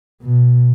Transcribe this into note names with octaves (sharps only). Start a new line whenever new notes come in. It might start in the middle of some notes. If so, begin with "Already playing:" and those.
B2